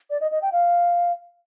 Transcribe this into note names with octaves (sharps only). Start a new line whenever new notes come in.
D5
D#5
D#5
G5
F5